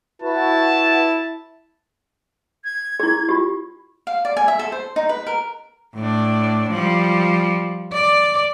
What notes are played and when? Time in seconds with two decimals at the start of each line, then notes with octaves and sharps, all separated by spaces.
0.22 E4 F#4 B4 A5
2.64 G#6
3.00 E4 G#4
3.29 F4 G4
4.07 F5
4.25 D5
4.37 G#5
4.48 E5
4.59 A4
4.72 C5
4.96 D#4
5.09 B4
5.27 A#4
5.96 A2 D4
6.70 F3 G3
7.93 D5